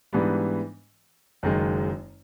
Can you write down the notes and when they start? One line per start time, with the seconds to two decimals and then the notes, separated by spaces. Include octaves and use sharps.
0.13 G#2 E3 G3 B3 D4
1.43 F#1 F#2 D#3 G#3